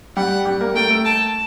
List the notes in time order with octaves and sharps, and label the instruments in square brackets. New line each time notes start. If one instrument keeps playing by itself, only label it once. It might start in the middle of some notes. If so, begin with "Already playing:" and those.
[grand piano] G3 G4 [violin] F#5
[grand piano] G3 G4
A#3 A#4
[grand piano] A3 A4 [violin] G5
[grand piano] A3 A4
[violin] A5